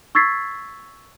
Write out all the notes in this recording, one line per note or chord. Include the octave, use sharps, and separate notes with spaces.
C#6 E6 G#6 A6 B6 C7